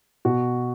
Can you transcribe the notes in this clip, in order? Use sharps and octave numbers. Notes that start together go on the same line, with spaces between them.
B2 F#4